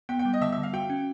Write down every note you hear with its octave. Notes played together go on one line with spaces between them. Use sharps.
B3 G5
G5
G3
D#5
D3 E5
E5
D3
F5
F#4 G5
C#4